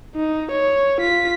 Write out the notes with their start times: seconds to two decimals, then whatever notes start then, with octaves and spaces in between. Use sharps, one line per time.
0.16 D#4
0.51 C#5
1.00 F4 B6